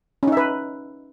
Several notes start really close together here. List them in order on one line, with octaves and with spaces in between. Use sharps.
C#4 D#4 E5 B4